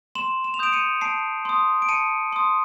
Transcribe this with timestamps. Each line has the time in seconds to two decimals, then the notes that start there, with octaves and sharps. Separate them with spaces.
0.15 C6 E7 F#7
0.44 E7
0.54 F7
0.59 D#6 G6 D7 E7
0.72 C#7 D#7
1.01 A5 C7 D7
1.45 C6 D#6
1.82 D7
1.89 A5 C#7 D#7
2.32 C6 D#6